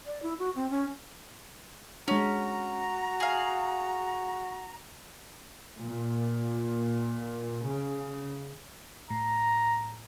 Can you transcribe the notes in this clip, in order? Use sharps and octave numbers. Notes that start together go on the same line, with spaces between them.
D5
E4
F#4
C4
C#4
G#3 C#4 D4 F#4 A#5
G#4 F5
A#2
C#3
A2 A#5